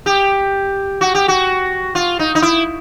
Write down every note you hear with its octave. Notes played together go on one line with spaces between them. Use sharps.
G4
F#4
G4
F#4
F4
D#4
D#4
E4